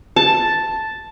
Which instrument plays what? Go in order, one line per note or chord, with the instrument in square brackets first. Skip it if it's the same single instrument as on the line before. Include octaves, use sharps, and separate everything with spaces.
[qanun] A5